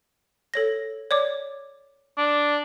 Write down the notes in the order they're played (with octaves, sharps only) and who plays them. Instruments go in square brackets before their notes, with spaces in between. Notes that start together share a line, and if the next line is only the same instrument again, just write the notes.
[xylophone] A4 C#5 A#6
C#5 D5 D6
[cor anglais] D4